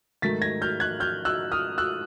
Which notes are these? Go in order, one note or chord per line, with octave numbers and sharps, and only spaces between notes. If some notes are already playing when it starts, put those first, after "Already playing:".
G#2 D#3 F#3 A3 A6 B6
G#6 A#6
F6 G6
F#6 G#6
F6 G6
E6 F#6
D#6 F6
E6 F#6